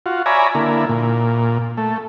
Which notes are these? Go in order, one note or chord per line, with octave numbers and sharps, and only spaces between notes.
F4 F#4
C#5 D5 E5 G#5 A#5 B5
D3 A#3 E4
A#2
A3